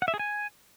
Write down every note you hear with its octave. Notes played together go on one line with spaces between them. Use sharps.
F#5
E5
G#4
G#5